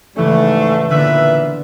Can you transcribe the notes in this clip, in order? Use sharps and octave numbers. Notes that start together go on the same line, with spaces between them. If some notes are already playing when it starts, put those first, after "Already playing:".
G#2 C#3 E3 G3 A3 C#4
A#2 D3 B3 B4 E5